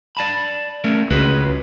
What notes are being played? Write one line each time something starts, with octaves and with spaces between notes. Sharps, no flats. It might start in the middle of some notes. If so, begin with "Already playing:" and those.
D5 A5 B5
A3 C#4 A#4
C#2 F#4 G#4 B4